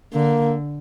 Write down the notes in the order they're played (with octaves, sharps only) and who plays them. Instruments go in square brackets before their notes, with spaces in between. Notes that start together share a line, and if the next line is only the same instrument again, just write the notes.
[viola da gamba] D3 [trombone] A#3